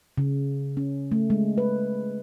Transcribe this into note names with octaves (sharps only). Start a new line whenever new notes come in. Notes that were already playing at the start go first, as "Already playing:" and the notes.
C#3
C#4
A3
G#3
B4